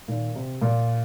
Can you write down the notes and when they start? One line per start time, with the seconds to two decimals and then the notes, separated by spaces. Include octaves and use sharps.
0.08 A#2 D#3
0.35 C3
0.61 A#2